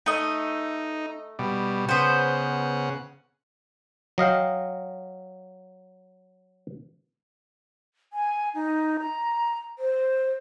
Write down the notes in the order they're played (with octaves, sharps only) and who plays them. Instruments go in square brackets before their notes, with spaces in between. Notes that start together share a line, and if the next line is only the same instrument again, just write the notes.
[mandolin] A3 D#5 [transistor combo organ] D#4
[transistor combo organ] B2 G3
[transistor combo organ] C#3 F#5 [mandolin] B3 C5
[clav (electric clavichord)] F#3 D#5 F5 G5
[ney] G#5
D#4
A#5
C5